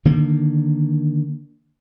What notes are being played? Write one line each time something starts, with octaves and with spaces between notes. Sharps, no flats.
D3 D#3 A#3